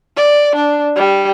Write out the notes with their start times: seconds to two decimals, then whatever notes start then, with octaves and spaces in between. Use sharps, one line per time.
0.17 D5
0.56 D4
0.96 G3